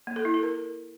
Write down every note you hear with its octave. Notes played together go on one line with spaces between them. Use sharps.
A#3
A4
E4
A4
A#4